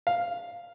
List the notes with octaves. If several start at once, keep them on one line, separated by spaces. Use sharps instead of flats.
F5